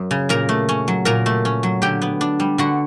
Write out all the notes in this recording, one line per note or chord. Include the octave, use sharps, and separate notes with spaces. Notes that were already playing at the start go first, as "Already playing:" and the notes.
Already playing: F#2
C#3
A#2 A#4 A#5
A3
C#4
F#3
A#2 A#4 A#5
A3
C#4
F#3
D3 G4 G5
B3
D4
G3
D3 F#4 F#5